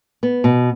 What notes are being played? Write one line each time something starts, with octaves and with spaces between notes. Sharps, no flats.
B3
B2